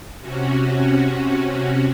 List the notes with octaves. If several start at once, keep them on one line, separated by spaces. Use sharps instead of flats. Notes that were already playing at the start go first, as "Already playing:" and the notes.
C3 C#4 F#4